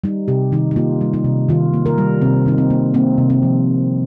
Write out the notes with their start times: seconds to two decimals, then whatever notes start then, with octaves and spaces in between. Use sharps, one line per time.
0.04 G3 D#4
0.28 C3 G4
0.52 D#3 D#4
0.71 D#4
0.76 A#3 F4
1.01 G3
1.14 D#4
1.24 C3
1.49 D#3 F4
1.74 A#3
1.86 A#4
1.98 G3
2.22 C3 C4
2.46 D#3 D#4
2.58 C4
2.70 A#3
2.94 A#3 C4
3.18 C3
3.30 C4
3.43 F3